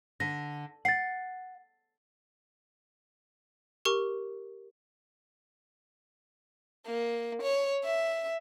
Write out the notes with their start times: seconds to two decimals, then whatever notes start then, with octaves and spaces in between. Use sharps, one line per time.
0.20 D3 A#6 B6
0.85 F#5 A6 C7
3.85 G4 A#4 C#6
6.86 A#3
7.42 C#5
7.84 E5